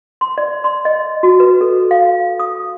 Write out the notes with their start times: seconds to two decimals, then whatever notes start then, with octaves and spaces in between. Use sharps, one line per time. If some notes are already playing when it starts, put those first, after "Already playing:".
0.21 C6
0.38 D5
0.64 C6
0.85 D#5
1.23 F#4
1.40 B4
1.61 A4
1.91 F5
2.39 D#6